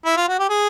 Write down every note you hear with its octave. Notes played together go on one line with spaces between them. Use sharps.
E4
F4
F#4
G4
G#4